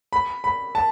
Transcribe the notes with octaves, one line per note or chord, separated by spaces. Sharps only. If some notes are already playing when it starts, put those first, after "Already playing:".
B5
B5
A5